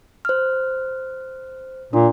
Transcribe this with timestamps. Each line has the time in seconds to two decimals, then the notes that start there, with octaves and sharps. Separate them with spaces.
0.25 C5 F6
1.93 A#2 D4